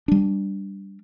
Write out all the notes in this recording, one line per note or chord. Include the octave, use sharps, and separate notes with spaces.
G3 D4